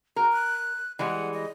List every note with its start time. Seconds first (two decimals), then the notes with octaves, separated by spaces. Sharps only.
0.16 F#4 A#4
0.32 F#6
0.99 E3 G3 G#3 F#5
1.33 D#5